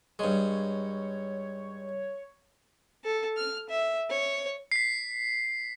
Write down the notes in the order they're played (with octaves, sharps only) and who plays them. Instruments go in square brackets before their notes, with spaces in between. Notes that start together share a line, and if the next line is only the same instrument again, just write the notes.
[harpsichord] G2 G#3 [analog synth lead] C#5
[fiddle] A4
F6
E5
C#5
[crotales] B6 C7